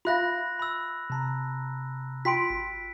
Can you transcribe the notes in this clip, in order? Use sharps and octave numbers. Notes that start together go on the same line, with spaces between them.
F4 E5 F5 B5 C6 F#6 A#6
B5 E6
C3 A5 A#5
F4 G5 C6 B6 D7
G#1